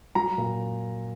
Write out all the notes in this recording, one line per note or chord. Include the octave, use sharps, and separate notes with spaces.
F#3 A#5
A#2